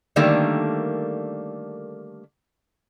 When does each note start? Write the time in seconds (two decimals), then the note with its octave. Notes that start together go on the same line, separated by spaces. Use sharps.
0.16 D3 D#3 G3 A3 A#3